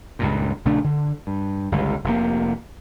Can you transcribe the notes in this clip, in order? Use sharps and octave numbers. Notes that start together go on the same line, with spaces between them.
C#2 G2 A#2
A#1 C#3 A3 D4
D3
G2
G1 C#2 G2
F1 C3 A#3